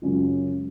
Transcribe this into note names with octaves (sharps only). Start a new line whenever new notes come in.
F#2 C#3 G#3 C#4 F4